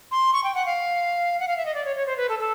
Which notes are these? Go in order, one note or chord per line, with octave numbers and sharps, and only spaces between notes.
C6
C#6
G5
F#5
F5
F#5
F5
E5
D#5
D5
C#5
C#5
C5
B4
A4
A4